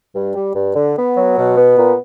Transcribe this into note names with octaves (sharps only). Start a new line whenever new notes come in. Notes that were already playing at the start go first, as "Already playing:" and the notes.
G2
G3
G2
D3
B3
F#3
B2
B3
A#2